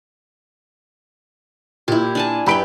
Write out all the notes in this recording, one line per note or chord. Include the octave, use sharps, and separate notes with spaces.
A#2 E4 G4
D4 G#5 A5
F#2 G4 B4 G5 B5 D7